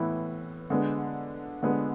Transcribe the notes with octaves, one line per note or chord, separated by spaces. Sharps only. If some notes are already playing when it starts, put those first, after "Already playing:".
Already playing: A2 E3 B3 E4
D3 G#3 B3
D3 G#3 B3